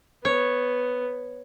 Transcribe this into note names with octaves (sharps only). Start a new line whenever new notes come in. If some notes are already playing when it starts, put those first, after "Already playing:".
B3 C#5